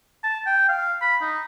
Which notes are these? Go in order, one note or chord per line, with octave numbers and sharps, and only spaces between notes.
A5
G5
F5
B5
D#4